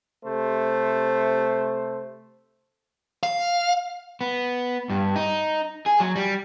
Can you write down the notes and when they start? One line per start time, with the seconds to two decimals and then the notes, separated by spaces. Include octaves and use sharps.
0.24 C3 A3 C5
3.23 F5
4.21 B3
4.90 G2
5.16 D#4
5.86 G#4
6.00 F#3
6.16 G3